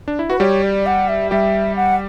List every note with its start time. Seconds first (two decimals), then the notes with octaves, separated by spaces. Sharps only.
0.08 D4
0.19 E4
0.30 F#4 B4
0.40 G3 G4 C#5
0.63 D5
0.86 F#5
1.08 E5
1.31 G3 G4 E5
1.76 F#5